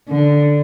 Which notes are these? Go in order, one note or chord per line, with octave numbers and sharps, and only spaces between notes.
D3